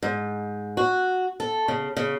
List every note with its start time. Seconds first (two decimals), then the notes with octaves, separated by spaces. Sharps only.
0.03 G#2
0.77 F#4
1.40 A4
1.68 C#3
1.97 C#3